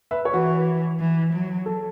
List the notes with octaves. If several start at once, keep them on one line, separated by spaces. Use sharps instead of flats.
B4 E5
C#5
E3 F#4 B4
E3
F#3
A4